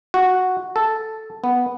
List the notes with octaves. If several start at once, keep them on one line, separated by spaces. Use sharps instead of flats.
F#4
A4
B3